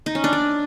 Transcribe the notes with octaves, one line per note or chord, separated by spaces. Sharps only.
D#4
C#4
D4
D5